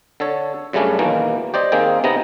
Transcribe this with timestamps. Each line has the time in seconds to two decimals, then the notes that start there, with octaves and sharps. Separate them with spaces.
0.20 D3 A4 C#5
0.73 F#2 C#3 G3 A3 C#4 D4
0.99 D#2 B2 E3 A#3
1.54 G4 C5 D5 D#5
1.72 D#3 A#3 C4 G#4 G5
2.04 C3 B3 D#4 A#5